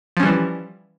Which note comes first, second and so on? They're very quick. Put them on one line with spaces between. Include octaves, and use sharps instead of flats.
F3 C#4 G3 E3